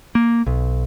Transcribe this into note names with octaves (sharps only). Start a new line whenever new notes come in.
A#3
B1